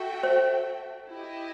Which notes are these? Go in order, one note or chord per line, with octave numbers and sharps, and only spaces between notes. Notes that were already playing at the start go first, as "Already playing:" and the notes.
Already playing: F#4 A4 E5 G5
C5
E4 G4 D#5